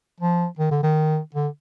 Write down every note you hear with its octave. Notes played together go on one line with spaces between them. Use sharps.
F3
D#3
D3
D#3
D3